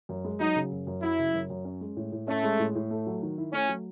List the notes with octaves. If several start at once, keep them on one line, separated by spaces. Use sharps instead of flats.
F#2
G#3
F#3 D#4
C#3
F#2
F#2
F#3 E4
C#3
F#2
F#2
C#4
G#3
A2
A2
A3 C#4
G#3
A2
A2
A3
F#3
D#3
E4
A3 C#4
F#3